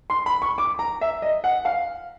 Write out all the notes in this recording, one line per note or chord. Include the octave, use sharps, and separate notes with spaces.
C6
B5
C#6
D6
A#5
E5
D#5
F#5
F5